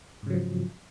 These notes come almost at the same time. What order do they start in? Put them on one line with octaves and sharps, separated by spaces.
G#2 C#3 F#3 F3